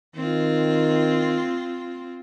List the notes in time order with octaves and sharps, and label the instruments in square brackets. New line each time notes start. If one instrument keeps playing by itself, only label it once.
[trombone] D#3 [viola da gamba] C4 F4